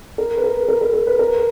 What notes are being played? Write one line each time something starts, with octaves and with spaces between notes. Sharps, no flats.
A#4
B4
A#4
A#4
A#4
A#4
B4
A#4